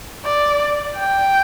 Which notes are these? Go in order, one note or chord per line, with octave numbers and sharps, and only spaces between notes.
D5
G5